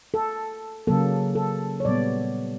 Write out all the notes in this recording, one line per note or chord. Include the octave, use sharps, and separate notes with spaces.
A4
C#3 F#3 A#3 A4
A4
C#5
A#2 G3 B3 D5